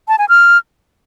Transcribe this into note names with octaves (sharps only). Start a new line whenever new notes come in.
A5
G#5
F6